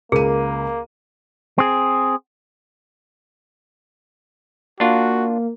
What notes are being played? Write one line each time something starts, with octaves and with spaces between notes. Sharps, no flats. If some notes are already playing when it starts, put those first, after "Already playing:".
C#2 A#3 G#4 A#4 D#7
C4 G#4
A#3 D4 F4 F#4